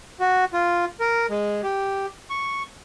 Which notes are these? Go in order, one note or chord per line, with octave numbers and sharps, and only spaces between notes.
F#4
F4
A#4
G#3
G4
C#6